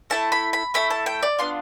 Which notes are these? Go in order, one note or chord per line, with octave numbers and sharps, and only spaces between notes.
A3 E4 A4 A5
B5
B5
A3 E4 A4 B5
A5
G5
D5
B3 D4 F4 C6